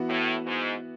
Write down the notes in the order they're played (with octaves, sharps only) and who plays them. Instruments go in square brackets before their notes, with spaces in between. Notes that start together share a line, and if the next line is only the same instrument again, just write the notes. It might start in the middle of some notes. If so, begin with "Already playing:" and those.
Already playing: [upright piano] E3 B3 F#4
[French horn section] A2
G#2